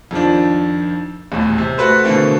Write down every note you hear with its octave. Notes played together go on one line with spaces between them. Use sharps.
F2 D#3 F3 D4
D#1 E2 A2
C3
A3 F#4 B4 C5
B2 D3 E3 A3 A#3 C4